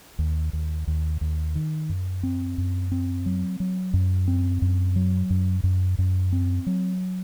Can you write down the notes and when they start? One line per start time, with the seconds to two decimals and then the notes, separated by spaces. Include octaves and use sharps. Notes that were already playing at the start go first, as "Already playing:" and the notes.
0.19 D#2
0.53 D#2
0.87 D#2
1.21 D#2
1.55 D#3
1.89 F#2
2.23 C4
2.58 F#2
2.92 C4
3.26 F#3
3.60 F#3
3.94 F#2
4.28 C4
4.62 F#2
4.96 F#3
5.30 F#2
5.64 F#2
5.98 F#2
6.32 C4
6.66 F#3